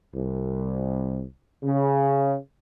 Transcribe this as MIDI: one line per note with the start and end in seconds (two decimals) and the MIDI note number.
0.14 1.22 36
1.63 2.37 49